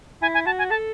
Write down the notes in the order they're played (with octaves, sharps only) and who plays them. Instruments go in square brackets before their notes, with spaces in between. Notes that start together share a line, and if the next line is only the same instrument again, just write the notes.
[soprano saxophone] E4 [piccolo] G#5
[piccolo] G#5
[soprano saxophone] F#4 [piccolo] A5
[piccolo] G#5
[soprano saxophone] A4 [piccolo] A5